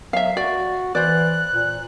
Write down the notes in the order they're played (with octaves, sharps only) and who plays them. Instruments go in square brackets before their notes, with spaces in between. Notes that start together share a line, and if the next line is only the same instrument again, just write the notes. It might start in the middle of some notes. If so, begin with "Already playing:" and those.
[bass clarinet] F#3 [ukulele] E5 F5
[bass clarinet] F#4 [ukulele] D5
[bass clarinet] E3 [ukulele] C5 D5 [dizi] F#6
[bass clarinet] A#2